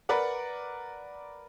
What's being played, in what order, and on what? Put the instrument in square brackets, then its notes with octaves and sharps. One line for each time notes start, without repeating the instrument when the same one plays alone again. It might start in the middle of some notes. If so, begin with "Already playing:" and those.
[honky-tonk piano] A#4 B4 D5 F#5